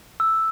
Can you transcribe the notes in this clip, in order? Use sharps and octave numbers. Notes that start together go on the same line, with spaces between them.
E6